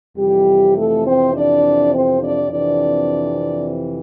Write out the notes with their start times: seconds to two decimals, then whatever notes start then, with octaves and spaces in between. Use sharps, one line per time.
0.17 F2 C3 E3 G3 G4
0.76 A3 A4
1.04 C4 C5
1.34 D4 D5
1.92 C4 C5
2.21 D4 D5
2.50 F2 C3 E3 D4 D5